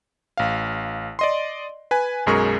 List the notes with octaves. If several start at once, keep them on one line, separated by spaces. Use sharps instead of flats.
A1 F5
D5 D#5 C6
B4 G#5
B1 F#2 G#3 G#4 A#4 C#6